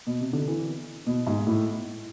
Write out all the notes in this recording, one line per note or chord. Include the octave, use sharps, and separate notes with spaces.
B2
C3
D3
E3
B2
G#2
A2